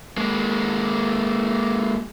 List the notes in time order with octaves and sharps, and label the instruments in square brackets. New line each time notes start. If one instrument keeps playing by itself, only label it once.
[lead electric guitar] G#3 A#3